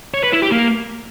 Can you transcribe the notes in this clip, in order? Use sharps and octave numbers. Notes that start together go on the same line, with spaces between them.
C#5
B4
E4
G4
A#3